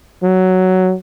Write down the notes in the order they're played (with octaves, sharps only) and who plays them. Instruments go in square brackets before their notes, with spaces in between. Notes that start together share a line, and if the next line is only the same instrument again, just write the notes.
[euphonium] F#3